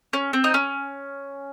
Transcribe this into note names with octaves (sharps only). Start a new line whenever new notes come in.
C#4
C4
D#4
C#4